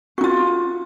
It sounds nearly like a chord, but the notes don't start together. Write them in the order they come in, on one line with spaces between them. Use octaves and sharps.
F#4 D#4 F4